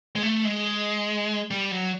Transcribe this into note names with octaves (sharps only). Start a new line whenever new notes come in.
G#3
A3
G#3
G3
F#3